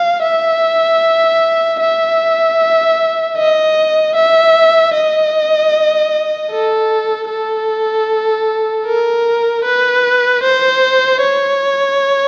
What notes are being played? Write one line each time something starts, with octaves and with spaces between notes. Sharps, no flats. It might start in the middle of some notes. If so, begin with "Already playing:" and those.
Already playing: F5
E5
E5
D#5
E5
D#5
A4
A4
A#4
B4
C5
C#5